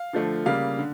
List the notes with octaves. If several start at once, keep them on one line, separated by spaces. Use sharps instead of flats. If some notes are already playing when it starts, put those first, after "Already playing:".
Already playing: F5
D3 F3 A3
C#3 G3 A#3 F5
D3